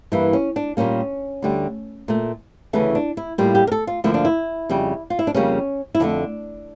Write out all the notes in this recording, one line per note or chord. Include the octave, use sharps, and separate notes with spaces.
G2 E3 A#3 E4
C#4
D4
A#2 G3 A#3 C#4
D2 D3 G3
A#2 A3
D2 C#3 E3 A3 C#4
D4
E4
A2 G3 A#3 F4
G4
A#4
A4
F4
D2 D3 F3 A#3 E4
D4
E4
F2 C#3 G3
F4
E4
D4
F2 C#3 G3 A#3 C#4
E4
F2 D3 A3 D4